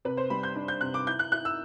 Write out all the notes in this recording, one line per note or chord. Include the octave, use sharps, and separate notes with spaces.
C3 B4
C5
G3 B5
G6
D4
G6
C3 F#6
D6
E4 G6
F#6
E4 F#6
E6